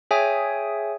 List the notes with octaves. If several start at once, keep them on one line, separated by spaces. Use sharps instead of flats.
G#4 C#5 E5 G5 G#5 D#6